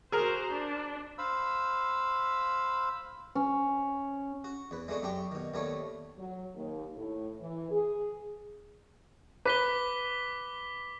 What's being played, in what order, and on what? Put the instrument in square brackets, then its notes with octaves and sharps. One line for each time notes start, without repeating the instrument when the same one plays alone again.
[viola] F#4 C5 [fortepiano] G#4 A#4
[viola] D4
[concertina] C5 F5 B5 E6
[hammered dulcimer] C#4
[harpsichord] F#4
E2 B4
G#3 A3 B3 D4 F#4
F#2 D4 G4 G5 C#6
B2 D#3
D#2 D#3 A3 B3 D4 C#5
[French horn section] F#3
D#2
A2
E3
G#4
[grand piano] B4 [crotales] D6 B6 G7